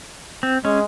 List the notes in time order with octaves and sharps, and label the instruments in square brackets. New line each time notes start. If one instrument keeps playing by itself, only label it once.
[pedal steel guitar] C4
[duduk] G#3 [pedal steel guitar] C#4